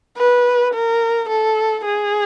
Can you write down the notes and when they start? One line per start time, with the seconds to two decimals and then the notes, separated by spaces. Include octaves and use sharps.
0.17 B4
0.74 A#4
1.29 A4
1.84 G#4